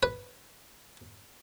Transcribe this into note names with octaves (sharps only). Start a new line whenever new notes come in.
B4